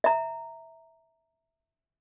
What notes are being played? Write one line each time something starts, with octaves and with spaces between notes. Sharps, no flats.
E5 A#5